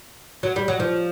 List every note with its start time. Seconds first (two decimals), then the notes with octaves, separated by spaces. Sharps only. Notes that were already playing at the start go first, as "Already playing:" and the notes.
0.43 F#3
0.56 G3
0.68 F#3
0.80 F3